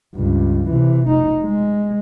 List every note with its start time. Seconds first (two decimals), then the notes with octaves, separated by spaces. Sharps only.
0.14 C#2 G2
0.68 C3 E3
1.08 F1 D#4
1.44 G#3